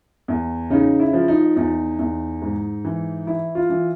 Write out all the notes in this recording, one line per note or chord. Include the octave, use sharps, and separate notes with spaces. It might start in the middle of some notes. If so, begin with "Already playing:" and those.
E2
C#3 D#4
E4
F3
D#4
E2 D#4
E2
G#2
E3
E3 E4
F4
E3